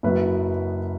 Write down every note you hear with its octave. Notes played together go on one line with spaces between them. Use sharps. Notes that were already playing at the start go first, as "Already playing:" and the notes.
F#1 F#2 F#3 B4